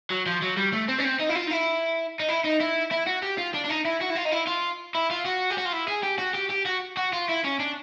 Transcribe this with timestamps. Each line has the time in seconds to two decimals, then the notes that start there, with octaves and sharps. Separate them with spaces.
0.10 F#3
0.26 F3
0.42 F#3
0.57 G3
0.73 A3
0.88 C4
0.99 C#4
1.05 C4
1.19 D#4
1.29 E4
1.35 F4
1.47 D#4
1.51 E4
2.20 D#4
2.28 E4
2.44 D#4
2.60 E4
2.91 E4
3.07 F#4
3.23 G4
3.38 F4
3.54 D4
3.65 D4
3.70 D#4
3.85 E4
4.01 F#4
4.10 E4
4.16 F4
4.25 D#4
4.32 E4
4.47 F4
4.95 E4
5.10 F4
5.25 F#4
5.50 G4
5.58 F#4
5.65 F4
5.73 E4
5.88 G#4
6.03 G4
6.19 F#4
6.35 G4
6.50 G4
6.66 F#4
6.97 F#4
7.13 F4
7.29 E4
7.44 C#4
7.60 D4